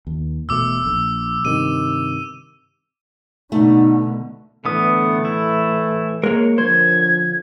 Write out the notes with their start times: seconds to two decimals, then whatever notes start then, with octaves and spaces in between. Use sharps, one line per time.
0.07 D#2
0.49 E1 B2 A3 D6 E6
0.86 A#1
1.45 G2 C3 D#3 D#7
3.52 B2 D3 A3 D#4
4.65 A2 D3 E3 A3 B3 D#6
5.25 E4
6.24 G#3 A#3 A#4 C#5
6.58 D3 F3 C5 G#6